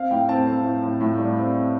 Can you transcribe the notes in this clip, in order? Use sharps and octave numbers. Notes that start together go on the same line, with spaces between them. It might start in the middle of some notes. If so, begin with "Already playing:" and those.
Already playing: C4 F5
A2 G5
C4 A5
C4
A2
A2
A2
G3
C4
C4